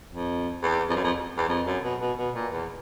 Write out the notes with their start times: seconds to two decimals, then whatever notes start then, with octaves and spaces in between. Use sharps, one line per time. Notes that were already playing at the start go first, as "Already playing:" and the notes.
0.12 F2
0.63 E2
0.89 F2
0.96 F#2
1.04 F2
1.38 E2
1.49 F2
1.66 F#2
1.84 B2
2.01 B2
2.18 B2
2.35 A#2
2.52 E2